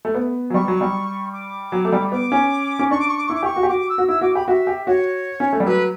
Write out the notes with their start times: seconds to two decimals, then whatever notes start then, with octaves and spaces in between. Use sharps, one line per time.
0.05 A3
0.15 B3
0.50 F#3
0.54 G3 C#6
0.68 F#3
0.81 G3
1.33 D6
1.72 F#3
1.85 A3
1.92 G3
2.12 B3 D6
2.32 C#4
2.79 C#4
2.91 D4 C#6
3.00 D6
3.08 C#6
3.17 D6
3.27 E4 C#6
3.35 D6
3.43 G4 C#6
3.56 F#4
3.63 G4
3.69 F#4 D6
3.89 E6
3.98 F#4
4.08 E4 E6
4.21 F#4 D6
4.35 G4 B5
4.47 F#4 E5
4.67 G4
4.87 F#4 C#5
5.40 C#4
5.53 A3
5.60 G3
5.65 F#3 B4